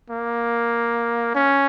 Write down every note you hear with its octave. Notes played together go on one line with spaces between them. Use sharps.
A#3
C#4